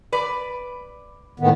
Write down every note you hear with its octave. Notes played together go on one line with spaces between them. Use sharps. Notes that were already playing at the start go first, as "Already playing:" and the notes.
B4 D5
A2 D#3 B3